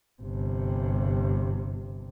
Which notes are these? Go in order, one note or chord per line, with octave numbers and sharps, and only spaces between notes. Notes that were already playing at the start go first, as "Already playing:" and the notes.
G1 C3